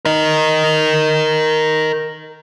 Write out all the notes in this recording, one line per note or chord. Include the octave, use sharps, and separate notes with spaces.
A#4 D#5